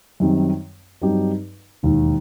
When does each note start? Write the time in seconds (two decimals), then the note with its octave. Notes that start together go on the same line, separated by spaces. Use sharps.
0.20 F#2 D#3 G3 C4
1.02 G2 F#3 C4 D#4 G4
1.83 E1 D#2 D#3